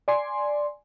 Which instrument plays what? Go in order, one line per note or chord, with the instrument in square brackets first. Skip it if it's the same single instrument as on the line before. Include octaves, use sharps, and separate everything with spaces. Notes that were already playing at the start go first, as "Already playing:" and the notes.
[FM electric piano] D5 G#5 C6